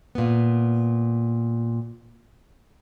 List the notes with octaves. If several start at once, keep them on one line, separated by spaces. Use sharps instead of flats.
A#2 B3